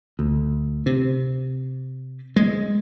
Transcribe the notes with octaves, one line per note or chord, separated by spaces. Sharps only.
D2
C3
G#3